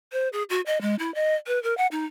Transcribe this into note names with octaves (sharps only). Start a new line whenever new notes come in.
C5
G#4
F#4
D#5
G#3
E4
D#5
B4
A#4
F#5
D#4